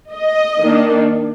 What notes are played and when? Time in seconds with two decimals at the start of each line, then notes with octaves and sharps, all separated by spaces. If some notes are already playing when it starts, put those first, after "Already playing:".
0.12 D#5
0.60 D#3 A#3 D4